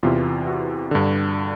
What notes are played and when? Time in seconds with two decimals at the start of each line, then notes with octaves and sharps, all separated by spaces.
0.03 E2 C3 E3 F4
0.47 F#4
0.91 G2 D3